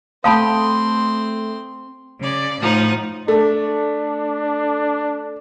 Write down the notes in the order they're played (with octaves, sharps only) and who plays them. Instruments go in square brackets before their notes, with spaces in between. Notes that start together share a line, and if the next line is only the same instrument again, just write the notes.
[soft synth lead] A3 [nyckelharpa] C4 C6 [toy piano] F5 A5 B5 [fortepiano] G5 D#6
[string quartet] C#3 D5
A2 F3 D#4 F#5
[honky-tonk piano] A3 [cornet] D4